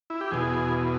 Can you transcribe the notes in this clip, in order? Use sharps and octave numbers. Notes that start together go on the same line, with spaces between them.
E4
G4
E2 B2 G#4